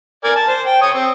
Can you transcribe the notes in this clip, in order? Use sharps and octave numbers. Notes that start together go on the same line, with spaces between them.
A#4 D5 G#5
A5
C5
G5
C#5 C#6 D#6
C4